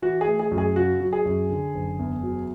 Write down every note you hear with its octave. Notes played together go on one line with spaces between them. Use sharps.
E3 F#4
G#4
A3
G#4
F#2
G#4
C#3 F#4
F#3
G#4
F#2
D3
F#1
E2
F#3